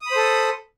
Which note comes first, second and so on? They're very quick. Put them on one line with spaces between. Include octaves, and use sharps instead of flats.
D#6 B5 C5 A4